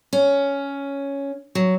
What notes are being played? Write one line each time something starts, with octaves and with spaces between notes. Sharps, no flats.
C#4
F#3